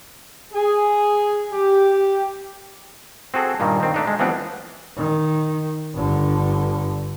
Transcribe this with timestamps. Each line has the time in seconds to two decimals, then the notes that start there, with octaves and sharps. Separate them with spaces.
0.53 G#4
1.51 G4
3.34 C4 F#4 G#4 A4
3.60 G2 A#2 D#3 G3 A#3
3.80 D#3 C4
3.94 A3 D4 D#4
4.07 G#3
4.19 E3 F3 G3 B3 C4 D4
4.96 D#3
5.93 G1 D3